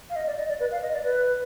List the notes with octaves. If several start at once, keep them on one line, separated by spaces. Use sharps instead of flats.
F5
D#5
D5
D#5
D5
B4
F5
D#5
D5
B4